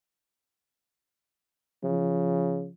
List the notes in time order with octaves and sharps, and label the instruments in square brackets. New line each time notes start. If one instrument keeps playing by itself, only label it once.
[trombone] C#3 [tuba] F3